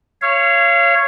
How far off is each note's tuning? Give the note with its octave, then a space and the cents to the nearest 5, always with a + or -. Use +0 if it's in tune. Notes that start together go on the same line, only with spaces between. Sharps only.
C#5 +0 F5 -30